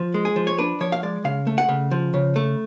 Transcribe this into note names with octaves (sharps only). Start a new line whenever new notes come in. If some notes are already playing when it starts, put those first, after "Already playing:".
Already playing: F3
G#3
G#4
F3
C#5
D4 B4
F3 C#5
F5
G#3 D5
C#3 F5
A3
F#5
C#3
F3
C#3
A3